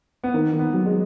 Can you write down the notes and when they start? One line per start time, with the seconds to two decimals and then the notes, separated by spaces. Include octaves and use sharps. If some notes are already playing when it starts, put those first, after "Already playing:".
0.24 B3
0.34 D#3 A#3
0.53 D#3
0.59 B3
0.74 F#3
0.86 G#3